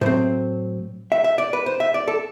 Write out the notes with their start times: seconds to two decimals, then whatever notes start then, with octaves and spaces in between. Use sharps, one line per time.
0.01 A2 F#3 C4 C5
1.12 E5
1.24 E5
1.38 D5
1.53 B4
1.66 C5
1.80 E5
1.94 D5
2.08 A4